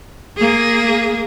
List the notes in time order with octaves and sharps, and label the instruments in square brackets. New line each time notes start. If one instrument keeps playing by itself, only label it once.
[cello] A#3 G#4